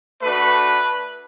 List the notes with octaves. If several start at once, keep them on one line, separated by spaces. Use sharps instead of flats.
A3 D4 F#4 B4